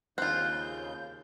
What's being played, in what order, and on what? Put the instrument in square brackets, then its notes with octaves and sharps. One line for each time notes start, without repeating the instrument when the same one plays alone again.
[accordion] D#2 C#3 G6 [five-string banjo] C4 F4 [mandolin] F#6